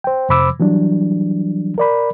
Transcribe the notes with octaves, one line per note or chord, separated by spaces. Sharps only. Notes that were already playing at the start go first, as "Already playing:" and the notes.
C5 G5
F2 C3 C5 B5 D6 E6
E3 F#3 G3 D4
A#4 D5 B5